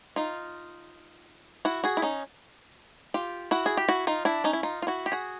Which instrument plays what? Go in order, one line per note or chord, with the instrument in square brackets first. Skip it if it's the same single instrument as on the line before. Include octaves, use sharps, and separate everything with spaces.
[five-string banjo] D#4 F4
E4 F#4
F#4 G#4
E4
C#4 D#4
F4 G4
E4 F#4
G#4
G4
E4 F#4
D#4 F4
D4 E4
C#4 D#4
E4
D#4 F4
F4
E4 F#4
G4
F#4 G#4